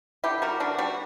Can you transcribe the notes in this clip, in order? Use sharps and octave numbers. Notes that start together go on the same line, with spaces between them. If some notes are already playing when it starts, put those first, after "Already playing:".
D3 E4 G4
G3 F#4 A#4
D3 D4 F#4
G3 D4 F#4